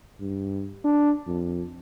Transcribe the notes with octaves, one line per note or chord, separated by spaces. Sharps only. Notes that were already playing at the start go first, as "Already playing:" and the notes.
G2
D4
F2